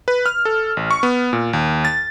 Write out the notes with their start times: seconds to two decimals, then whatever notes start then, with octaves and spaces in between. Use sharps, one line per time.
0.08 B4
0.26 F6
0.45 A4
0.77 A1
0.91 C#6
1.03 B3
1.33 A#2
1.53 D#2
1.85 A6